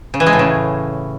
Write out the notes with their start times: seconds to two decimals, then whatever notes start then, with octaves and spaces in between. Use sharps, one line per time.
0.14 C#3
0.20 E3
0.26 G#3
0.33 A2
0.39 C#3